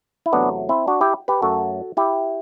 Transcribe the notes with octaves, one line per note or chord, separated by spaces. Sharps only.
E4
E2 C3 F#3 A3 B3 D4
C4 E4
D4 F#4
E4 G4
G4 B4
F#2 F#3 A3 F#4 A4
E4 G4